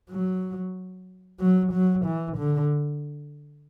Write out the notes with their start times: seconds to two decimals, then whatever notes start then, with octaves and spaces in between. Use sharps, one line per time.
0.10 F#3
1.40 F#3
1.72 F#3
2.06 E3
2.38 D3